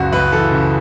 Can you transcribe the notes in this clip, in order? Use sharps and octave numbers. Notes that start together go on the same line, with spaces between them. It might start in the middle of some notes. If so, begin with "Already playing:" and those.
Already playing: F#1 C#2 F#4
C#2 B4
E3 A4
C#3